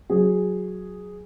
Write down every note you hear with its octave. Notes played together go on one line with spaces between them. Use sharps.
F#3 G#4